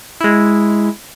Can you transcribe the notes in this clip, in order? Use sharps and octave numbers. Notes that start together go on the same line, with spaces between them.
G#3 E4